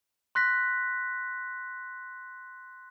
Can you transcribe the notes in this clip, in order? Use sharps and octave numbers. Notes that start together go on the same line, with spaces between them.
C6 F#6 A#6 B6